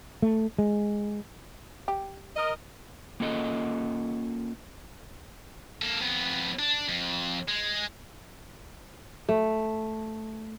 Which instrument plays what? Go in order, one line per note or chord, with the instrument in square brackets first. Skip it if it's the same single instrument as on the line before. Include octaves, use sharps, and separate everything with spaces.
[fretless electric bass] A3
G#3
[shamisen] G4
[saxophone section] A#4 D#5
[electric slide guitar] A#3 C#4 F4 A4 D5 D#5
[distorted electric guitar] A#3 A4
F2 B3
D4
F2
G#3
[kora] A3